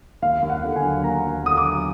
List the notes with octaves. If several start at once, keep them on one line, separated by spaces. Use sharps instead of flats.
D#2 F5
D#2
F#5
D3
G#5
F#3
D#2 A#5
D#2
D3 D#6
D6
F#3